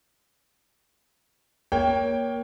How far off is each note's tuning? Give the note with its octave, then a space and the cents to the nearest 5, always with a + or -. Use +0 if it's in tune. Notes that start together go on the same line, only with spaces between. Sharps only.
A#3 +15 C#5 +10 G5 +0